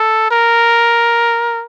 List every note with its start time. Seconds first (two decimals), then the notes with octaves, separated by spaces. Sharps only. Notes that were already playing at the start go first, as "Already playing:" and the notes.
Already playing: A4
0.31 A#4